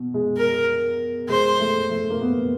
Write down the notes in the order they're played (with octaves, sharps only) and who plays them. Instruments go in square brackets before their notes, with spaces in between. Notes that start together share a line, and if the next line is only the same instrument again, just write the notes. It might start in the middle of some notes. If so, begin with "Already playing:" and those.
Already playing: [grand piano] B2
G#3
[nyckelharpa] A#4
[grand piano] G#3 [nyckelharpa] C5
[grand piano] A3
A3
A#3
B3